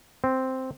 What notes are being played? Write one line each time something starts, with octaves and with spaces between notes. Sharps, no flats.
C4